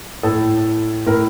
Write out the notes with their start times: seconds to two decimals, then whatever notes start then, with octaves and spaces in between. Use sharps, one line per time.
0.23 A2 A4
1.07 A2 A#4